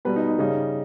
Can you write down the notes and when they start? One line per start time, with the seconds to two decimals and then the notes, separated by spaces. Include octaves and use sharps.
0.05 B2 G3 B4
0.16 D#4
0.27 D#4
0.39 C#3 G3 D#4